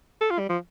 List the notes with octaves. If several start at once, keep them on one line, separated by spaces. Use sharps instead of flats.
A4
F4
G3
F3